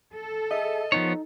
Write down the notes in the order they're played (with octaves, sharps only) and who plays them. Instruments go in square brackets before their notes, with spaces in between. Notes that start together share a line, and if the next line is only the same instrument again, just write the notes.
[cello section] A4
[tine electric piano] G#4 E5 A5 [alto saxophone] D#5
[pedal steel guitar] F3 B3 C#5 [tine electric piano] D#4